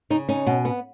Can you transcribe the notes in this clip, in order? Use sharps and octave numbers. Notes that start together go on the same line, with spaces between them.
C#3 D#4
C#4 D#4
B2
B3